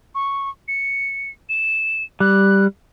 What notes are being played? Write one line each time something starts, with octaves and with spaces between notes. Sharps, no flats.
C#6
C#7
E7
G3 F#6